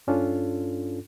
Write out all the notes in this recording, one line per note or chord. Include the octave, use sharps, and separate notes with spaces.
G2 C#4 D4 F4 A4